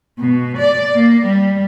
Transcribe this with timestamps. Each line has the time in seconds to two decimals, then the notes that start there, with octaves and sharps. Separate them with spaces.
0.19 B2
0.58 D5
0.95 A#3
1.26 G3